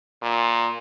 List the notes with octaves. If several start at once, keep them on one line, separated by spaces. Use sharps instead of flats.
A#2